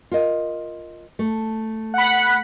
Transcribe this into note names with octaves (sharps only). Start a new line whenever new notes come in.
F4 A#4 D#5
A3
F#5 B5